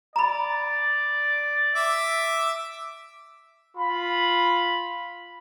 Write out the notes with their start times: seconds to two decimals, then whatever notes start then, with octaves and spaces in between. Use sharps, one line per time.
0.16 D5 A#5 B5
1.75 E5 D6
3.77 F4 B5